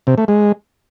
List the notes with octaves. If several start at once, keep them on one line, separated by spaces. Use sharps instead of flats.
C3
A3
G#3